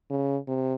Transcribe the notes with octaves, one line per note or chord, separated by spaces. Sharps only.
C#3
C3